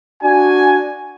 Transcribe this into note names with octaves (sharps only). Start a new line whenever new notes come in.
D4 F#4 G#5